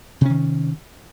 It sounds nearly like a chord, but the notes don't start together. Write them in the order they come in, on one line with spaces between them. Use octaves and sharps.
C3 C#4 D#3